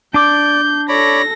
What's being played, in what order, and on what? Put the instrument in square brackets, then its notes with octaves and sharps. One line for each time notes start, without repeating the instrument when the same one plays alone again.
[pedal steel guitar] D4 D6 [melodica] D5 [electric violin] G6
[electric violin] A4 A#6 [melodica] C#5 D5 B5